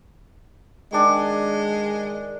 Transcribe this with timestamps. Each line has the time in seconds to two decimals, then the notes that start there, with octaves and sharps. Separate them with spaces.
0.93 D#3 G#3 D4